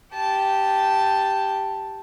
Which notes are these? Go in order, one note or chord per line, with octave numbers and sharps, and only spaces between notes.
G4 A5